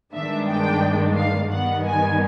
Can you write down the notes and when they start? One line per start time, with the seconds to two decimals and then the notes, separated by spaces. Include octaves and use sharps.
0.13 G2 D#3 G#3 B3 D4 E5
0.46 G5
1.15 F5
1.50 G2 D#3 G3 B3 F#5
1.84 G#5